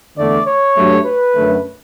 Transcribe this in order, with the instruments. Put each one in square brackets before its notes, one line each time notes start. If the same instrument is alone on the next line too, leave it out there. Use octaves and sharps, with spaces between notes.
[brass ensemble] E2 D3 A3 D5
C#5
G2 F#3 A3
B4
F#2 D3 A3